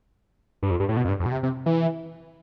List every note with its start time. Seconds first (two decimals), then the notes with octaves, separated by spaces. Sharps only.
0.63 G2
0.71 F2
0.80 G2
0.89 A2
0.97 B2
1.05 F2
1.09 G2
1.20 F2
1.26 B2
1.31 C3
1.43 C3
1.66 E3